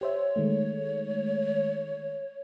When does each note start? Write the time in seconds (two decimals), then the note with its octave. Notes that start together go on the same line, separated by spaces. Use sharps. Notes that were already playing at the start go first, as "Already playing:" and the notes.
0.01 G4 C5 C#5 E5
0.36 D#3 G#3 A3